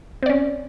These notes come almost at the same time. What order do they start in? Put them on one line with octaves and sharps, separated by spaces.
C4 D5 C#4